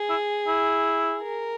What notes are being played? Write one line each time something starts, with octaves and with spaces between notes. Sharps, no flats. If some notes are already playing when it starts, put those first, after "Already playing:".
Already playing: G#4
E4
E4
A#4